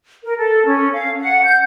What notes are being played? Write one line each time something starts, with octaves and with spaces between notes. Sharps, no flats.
A#4
A4
C#4
F5
F#5
G6